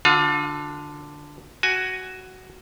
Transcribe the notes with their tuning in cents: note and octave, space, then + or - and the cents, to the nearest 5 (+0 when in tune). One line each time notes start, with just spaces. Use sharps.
D3 +0 F4 +40 F5 +0
F#4 +10 G#5 +0